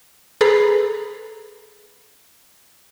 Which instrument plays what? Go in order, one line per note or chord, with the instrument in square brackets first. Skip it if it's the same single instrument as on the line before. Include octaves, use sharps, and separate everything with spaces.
[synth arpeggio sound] G#4 A4 B4 A#5 B5 C7